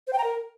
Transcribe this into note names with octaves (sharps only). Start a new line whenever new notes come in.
C5
G5
A#5
A#4